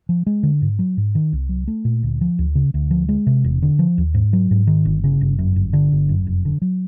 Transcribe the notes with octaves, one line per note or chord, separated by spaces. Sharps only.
F3
G#3
D3
G#2
F#3
G#2
D#3
C2
F#3
A3
A#2
D2
F3
D2
C#3
D2
F3
G#3
C3
E1
D3
F3
D#2
G#2
F#3
G#2
D#3
G1
C#3
G1
F#2
G1
D3
G1
F#2
F1
D3
F#3